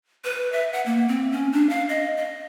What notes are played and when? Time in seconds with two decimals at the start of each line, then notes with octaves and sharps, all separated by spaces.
0.24 B4
0.52 E5
0.73 F#5
0.86 A#3
1.08 C4
1.32 C#4
1.52 D4
1.69 F5
1.89 D#5
2.17 D#5